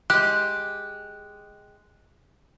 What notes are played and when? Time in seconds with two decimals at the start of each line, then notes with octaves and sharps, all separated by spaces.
0.10 G#3 G4 F#6